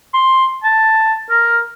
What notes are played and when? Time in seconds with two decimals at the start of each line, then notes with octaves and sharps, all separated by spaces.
0.14 C6
0.64 A5
1.30 A#4